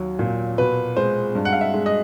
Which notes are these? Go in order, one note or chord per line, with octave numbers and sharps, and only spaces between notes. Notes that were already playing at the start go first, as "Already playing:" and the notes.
Already playing: D#2 F#3
A#2
B2 B4
G#3 C5
G2
F#5
F5
E5
G#3
D#5